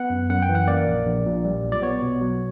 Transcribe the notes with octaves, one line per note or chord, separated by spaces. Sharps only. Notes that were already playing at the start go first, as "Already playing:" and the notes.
Already playing: B3 F#5
F#2
F#2 F#5
G5
E3
F#5
A#3 D5
A#1
A#1
A#2
G3
B1
D5
B3 C#5
B2
F#3